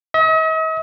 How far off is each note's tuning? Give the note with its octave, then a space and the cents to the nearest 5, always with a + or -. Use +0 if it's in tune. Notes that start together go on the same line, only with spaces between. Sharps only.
D#5 +45